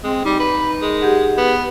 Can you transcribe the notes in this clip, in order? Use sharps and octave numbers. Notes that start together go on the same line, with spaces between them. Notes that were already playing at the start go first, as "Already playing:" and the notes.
G#3 C4
G3 D#4
B4
G#3 A#4
G4 G#4 F#5
B3